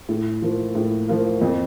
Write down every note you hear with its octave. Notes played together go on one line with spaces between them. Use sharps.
A2
F3 A#3 F4
A2
F3 A#3 F4
F2